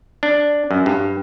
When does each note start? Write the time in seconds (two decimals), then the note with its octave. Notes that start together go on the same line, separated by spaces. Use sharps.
0.23 D4
0.71 F#2
0.86 G2